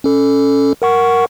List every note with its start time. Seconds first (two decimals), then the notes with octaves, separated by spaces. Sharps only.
0.04 C#4 A4
0.82 A#4 F#5 C#6